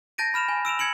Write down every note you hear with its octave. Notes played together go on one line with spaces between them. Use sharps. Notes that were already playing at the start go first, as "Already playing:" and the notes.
A5 G6 A6 A#6 D7 D#7
B5 F6 E7 F7
G#5
E6 D7 E7 F7
G#6 C#7 D7 F#7